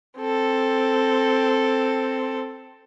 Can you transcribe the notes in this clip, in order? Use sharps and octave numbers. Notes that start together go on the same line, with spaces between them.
C4 A4